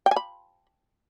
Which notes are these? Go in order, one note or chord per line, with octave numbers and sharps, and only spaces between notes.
G5
G#5
B5